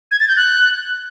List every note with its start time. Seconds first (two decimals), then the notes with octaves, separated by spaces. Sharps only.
0.11 G#6
0.20 A6
0.28 G6
0.37 F#6